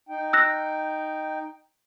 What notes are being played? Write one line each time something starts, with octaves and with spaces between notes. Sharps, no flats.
D#4 G5
E6 F#6 A#6